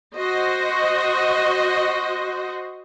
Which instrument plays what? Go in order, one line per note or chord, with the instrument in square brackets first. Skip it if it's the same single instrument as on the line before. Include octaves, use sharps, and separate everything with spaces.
[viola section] F#4 C5 D#5